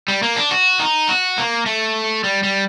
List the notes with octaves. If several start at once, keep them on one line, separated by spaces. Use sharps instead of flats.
G3
A#3
D4
F#4
D#4
F#4
A#3
A3
G3
G3